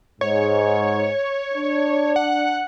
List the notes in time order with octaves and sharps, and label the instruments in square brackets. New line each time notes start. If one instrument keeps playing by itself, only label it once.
[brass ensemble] G#2 [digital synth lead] C#5
[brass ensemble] D4
[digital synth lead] F#5